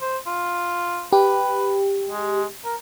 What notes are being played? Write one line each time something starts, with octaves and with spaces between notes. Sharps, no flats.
C5
F4
G4 B4
G#3
A#4